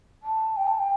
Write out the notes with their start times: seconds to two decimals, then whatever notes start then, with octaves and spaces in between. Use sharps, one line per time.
0.23 A5
0.57 G5
0.67 A5
0.79 G5